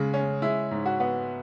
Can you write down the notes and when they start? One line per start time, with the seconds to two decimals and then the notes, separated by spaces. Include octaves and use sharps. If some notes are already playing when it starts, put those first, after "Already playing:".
Already playing: C#3 G#3
0.14 C#4
0.42 G#3 E4
0.71 G#2
0.86 F#4
1.00 B3